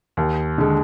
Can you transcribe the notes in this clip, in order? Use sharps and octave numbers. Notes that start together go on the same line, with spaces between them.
D#2
D3 G#3